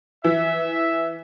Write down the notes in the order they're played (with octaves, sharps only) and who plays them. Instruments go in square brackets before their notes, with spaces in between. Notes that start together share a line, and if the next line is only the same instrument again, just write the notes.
[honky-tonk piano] E3 [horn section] E5